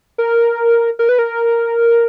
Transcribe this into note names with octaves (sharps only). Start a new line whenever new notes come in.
A#4
A#4
B4
A#4